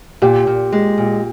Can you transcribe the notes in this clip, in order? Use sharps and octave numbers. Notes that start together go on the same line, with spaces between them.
A#2 G4
A#2
G#3
A#2